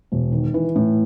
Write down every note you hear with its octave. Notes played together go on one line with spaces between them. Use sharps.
E1
D#3
E3
A2